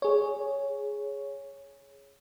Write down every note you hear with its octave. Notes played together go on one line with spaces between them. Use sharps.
G#4 C#5